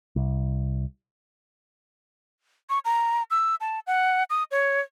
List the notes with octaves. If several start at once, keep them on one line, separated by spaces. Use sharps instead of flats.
C2
C#6
A#5
E6
A5
F#5
D#6
C#5